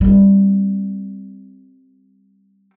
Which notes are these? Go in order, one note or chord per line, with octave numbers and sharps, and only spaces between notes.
G3 C4